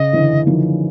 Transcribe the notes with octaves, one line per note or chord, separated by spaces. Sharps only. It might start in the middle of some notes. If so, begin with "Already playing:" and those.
Already playing: C#3 D#5
D3 E3
D#3 F3